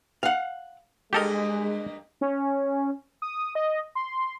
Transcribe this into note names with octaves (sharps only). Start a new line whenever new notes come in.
F5 F#5
G2 G#3 A#3 G4 A4 A#4 D#5
C#4
D#6
D#5
C6